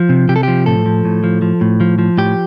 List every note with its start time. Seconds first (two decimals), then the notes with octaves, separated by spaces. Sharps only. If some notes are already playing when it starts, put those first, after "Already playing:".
Already playing: F3
0.09 C3
0.29 C3 G4
0.36 A4
0.43 F3 G4
0.66 A2 A4
0.86 F3
1.05 A2
1.24 F3
1.42 F3
1.61 A2
1.80 F3
1.99 F3
2.18 A2 G4